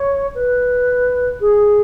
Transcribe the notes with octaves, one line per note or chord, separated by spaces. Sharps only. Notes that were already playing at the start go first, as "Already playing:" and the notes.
Already playing: C#5
B4
G#4